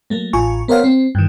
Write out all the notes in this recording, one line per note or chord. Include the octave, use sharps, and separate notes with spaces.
F#3 A3 A#3
A1 F4 G#5 C#6
B3 A#4 C5 C#5 F5 F#5
C4
G2 D#3